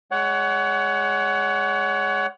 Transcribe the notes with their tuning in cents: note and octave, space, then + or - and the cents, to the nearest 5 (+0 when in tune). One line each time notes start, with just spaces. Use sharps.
G#3 +0 C#5 +30 F#5 +15